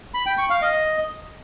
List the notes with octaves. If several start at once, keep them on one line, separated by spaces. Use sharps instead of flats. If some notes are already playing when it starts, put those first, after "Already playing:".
B5
G5
C#6
F5
D#5